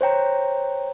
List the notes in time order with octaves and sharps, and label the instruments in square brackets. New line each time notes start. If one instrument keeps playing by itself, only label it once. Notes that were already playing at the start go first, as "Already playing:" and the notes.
[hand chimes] C5 C#5 G5 A#5